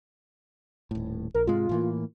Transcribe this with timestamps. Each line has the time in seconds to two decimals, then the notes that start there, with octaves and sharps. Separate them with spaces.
0.91 D#1 A2
1.34 A#1 A#4
1.47 G#2 C3 G#3 F4
1.69 A2 E3 A#3